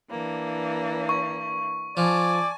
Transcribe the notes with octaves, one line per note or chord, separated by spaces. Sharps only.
E3 A#3 D4
C#6
F3 D5 G#5 A5